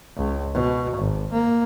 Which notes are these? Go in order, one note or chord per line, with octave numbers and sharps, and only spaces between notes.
C#2
B2
G#1
A#3